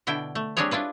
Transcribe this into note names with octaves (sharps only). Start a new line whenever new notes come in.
B2 D3 E4 G5
A3
G3 C4 D4 G4 G#4 C#5
D4 E4 F4 B4